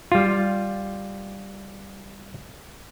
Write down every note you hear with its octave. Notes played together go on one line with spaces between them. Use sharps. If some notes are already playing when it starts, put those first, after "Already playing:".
G3 F4